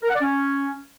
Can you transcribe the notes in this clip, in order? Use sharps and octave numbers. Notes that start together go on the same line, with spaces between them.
A#4
F#5
D5
C#4